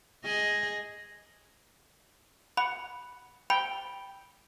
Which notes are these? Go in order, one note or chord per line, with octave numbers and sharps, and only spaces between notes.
G#4 D#5
F#5 B5
G5 B5